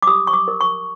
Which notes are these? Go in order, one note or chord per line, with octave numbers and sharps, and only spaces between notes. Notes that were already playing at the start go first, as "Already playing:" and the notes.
D6
G4 D#6
C#6
D6
A#4
C#6